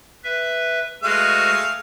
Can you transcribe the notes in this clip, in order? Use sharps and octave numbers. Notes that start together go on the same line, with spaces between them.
B4 E5
G#3 A3 F#4 G#4 B4 F5